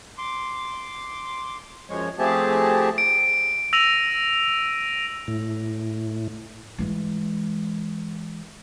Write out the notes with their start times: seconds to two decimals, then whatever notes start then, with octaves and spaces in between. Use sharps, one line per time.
0.18 C6 D6
1.89 F#2 F3 G#3 C#5
2.18 F3 A3 C4 G4 G#4 A5
2.98 D7
3.73 E6 A#6 D#7 F7
5.28 A2
6.78 E3 G#3